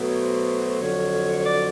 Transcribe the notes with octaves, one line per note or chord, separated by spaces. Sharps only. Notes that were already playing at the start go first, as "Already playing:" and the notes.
Already playing: B2 F#3 A3
C#5
C5
F2 D3 F#3 C#5
D5